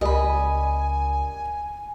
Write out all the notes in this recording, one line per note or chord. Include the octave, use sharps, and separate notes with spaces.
C#2 G4 A#4 D5 D#5 G#5 B5